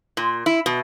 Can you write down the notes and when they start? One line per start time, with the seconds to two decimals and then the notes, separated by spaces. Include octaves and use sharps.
0.17 A#2
0.46 E4
0.66 B2